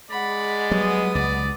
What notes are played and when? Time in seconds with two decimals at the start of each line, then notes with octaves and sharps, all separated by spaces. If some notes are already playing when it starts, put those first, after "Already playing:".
0.10 G#3 D5 F#5 B5
0.71 F#3 G3 B3 D#6
1.15 C#2 D5